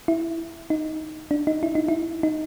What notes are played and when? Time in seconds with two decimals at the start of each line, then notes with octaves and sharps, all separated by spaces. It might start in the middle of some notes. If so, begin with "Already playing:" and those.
0.08 E4
0.70 D#4
1.31 D4
1.47 D#4
1.63 E4
1.75 D#4
1.88 E4
2.23 D#4